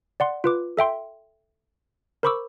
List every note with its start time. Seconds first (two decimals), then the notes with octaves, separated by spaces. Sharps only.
0.20 D5 F#5 C6
0.44 F4 B4 D6
0.77 A4 E5 G5 C6
2.23 A#4 C5 B5 C#6 D6 E6